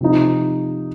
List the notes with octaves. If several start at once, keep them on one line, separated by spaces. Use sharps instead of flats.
C3 F3 D#4